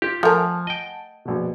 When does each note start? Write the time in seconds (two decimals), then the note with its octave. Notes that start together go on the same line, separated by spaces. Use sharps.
0.02 F4 G4
0.23 F3 A3 A#4 F#5 G#5 A5
0.67 D#5 G5
1.25 A#1 B2